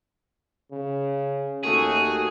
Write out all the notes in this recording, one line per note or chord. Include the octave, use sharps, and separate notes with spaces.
C#3
D#2 A3 F#4 G#4